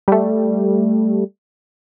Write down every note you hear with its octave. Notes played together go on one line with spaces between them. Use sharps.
G3 A3